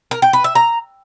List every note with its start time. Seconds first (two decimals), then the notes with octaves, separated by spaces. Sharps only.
0.11 A#4
0.22 G5
0.33 B4
0.44 E5
0.55 A#5